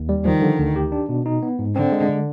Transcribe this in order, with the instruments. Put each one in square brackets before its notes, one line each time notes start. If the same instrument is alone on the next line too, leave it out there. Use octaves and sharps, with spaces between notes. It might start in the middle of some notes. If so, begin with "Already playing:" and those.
Already playing: [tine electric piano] D#2
G3
[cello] D#3 [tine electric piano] F3
[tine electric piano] D3
D2
G4
D4
B2
D#4
B3
G#2
[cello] D3 [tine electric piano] C4
[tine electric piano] G#3
D3